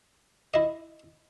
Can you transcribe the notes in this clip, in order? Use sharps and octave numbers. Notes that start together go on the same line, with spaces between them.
E4 D#5